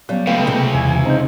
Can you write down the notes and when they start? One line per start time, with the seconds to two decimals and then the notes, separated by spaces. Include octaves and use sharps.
0.09 F#3 G3 B3 C#4
0.27 C#3 E3 G#3 A3 B3 F5 G5
0.47 C3 G4
0.75 E2 G#5
1.05 C4 D#4 A#5 G6